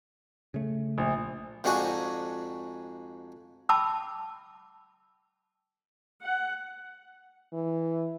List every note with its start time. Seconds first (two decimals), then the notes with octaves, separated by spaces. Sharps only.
0.54 C#3 A3
0.98 A#1
1.64 F2 G#2 D4 F#4 G#4 G#5
3.69 G5 A5 B5 D6 E6
6.21 F#5
7.53 E3